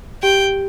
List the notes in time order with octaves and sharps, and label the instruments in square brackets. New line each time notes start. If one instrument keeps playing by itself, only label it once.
[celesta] G4 [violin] G5